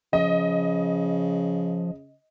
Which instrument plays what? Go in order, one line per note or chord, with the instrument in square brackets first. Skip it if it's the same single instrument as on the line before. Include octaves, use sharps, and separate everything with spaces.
[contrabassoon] C#3 [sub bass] F3 [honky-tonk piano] D#5